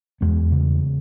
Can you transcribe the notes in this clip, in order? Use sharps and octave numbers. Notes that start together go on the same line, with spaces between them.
E2 G#3 B3
C#3